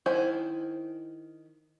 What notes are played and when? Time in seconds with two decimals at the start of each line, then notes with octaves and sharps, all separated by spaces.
0.06 D#3 E4 C5 G#5